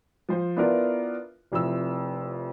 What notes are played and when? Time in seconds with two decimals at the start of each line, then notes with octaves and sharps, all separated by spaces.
0.29 F3 C5
0.57 B3 D4 E4 F4 A#4 B4
1.52 F1 F2 E4 E6